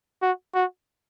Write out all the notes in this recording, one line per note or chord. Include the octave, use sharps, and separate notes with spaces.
F#4
F#4